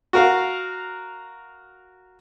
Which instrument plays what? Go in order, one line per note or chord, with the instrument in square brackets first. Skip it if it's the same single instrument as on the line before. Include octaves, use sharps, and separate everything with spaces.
[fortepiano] F#4 A#4 F5